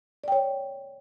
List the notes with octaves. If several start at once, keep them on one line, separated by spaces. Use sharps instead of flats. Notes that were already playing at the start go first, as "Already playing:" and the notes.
C#5 D5 G5